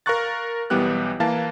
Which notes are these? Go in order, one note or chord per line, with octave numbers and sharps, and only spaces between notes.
A#4 F5 A#5 C#6 F#6 A6
B1 E3 G3 B3 G4 F#6
E3 A#3 F5 A5 A6